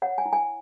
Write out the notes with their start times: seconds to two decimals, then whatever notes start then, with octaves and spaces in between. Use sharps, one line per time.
0.02 C#5 F#5
0.18 G#5
0.26 E4
0.33 G#5